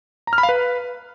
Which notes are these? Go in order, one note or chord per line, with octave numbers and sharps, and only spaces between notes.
A#5
F6
B5
F5
B4